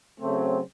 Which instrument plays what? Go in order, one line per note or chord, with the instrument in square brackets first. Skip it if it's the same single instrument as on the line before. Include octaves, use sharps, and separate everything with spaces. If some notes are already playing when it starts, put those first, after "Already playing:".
[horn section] C#3 F#3 A3 C4